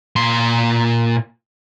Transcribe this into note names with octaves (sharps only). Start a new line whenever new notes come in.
A#2 C6